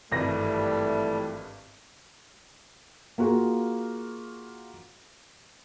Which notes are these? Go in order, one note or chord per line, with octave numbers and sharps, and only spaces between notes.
G#1 G2 E3 F3 G3 A3 A#6
A#3 F4 F#4 G#4